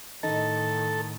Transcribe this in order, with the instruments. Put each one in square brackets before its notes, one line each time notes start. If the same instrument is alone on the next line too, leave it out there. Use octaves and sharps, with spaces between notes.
[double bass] A2 D#3 [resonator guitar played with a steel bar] D#4 [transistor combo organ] A4